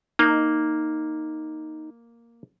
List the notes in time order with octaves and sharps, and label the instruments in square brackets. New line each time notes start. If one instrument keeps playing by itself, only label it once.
[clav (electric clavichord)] A#3 [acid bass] D#4